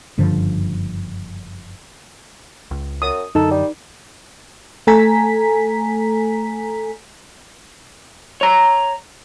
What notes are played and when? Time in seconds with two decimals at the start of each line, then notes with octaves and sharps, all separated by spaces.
0.18 F#1 G2 D3 F3
2.71 C#2
3.02 F#2 D#6
3.35 F#2 D3 D#4 A4
3.51 G3
4.87 A3 A4 G#5 A#5 B6
8.41 C#5 A#5